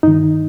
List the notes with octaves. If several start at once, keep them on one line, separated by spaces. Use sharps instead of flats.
G2 D#3 D#4